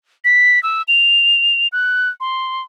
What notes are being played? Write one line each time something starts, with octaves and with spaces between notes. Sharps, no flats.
B6
E6
F7
F#6
C6